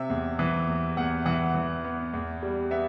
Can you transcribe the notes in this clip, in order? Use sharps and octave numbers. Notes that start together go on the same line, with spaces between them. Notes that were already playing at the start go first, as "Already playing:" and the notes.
Already playing: C3 E5
E2
E3
E2
E2 F#5
E3 F#5
E3
B3
E2
G3
B3 E5